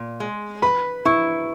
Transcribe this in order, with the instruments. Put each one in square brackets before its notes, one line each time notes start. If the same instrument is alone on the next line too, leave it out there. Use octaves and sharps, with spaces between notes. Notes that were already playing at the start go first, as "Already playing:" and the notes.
Already playing: [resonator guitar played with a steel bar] A#2
G#3
[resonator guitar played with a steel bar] B4 [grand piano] B5
[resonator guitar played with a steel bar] E4 [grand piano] C#6